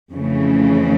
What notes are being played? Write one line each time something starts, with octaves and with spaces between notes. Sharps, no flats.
F2 C#3 E3 A3